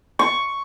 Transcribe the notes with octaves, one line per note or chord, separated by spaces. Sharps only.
C#6